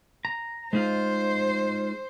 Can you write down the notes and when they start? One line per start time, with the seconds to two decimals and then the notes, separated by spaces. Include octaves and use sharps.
0.25 A#5
0.73 G#3 D#4 F4 C5